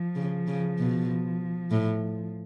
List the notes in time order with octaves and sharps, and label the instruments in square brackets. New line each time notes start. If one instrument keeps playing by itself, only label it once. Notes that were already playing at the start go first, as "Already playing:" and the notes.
Already playing: [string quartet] F3
[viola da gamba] C#3
C#3
B2
A2